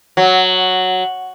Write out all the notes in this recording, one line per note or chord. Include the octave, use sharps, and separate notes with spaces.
F#3